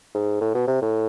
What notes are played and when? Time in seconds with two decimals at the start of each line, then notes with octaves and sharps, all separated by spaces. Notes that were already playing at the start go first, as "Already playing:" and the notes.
0.15 G#2
0.41 A2
0.54 B2
0.67 C3
0.82 A2